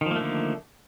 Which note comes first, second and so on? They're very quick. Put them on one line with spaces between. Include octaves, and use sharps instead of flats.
D#3 F3 A#3 A3 D3